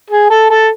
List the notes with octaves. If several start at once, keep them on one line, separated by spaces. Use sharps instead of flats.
G#4
A4
A4